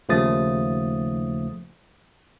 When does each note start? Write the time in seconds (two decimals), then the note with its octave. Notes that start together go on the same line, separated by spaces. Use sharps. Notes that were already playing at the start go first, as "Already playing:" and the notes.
0.09 D#2 C#3 F3 A3 D#6 A6